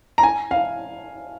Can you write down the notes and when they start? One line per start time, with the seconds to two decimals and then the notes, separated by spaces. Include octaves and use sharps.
0.18 A#5
0.23 G#5
0.51 F5